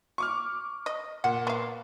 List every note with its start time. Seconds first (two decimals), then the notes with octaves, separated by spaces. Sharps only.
0.18 C#6 D6 F6
0.86 D#5
1.24 A#2 F#5
1.47 B3 F5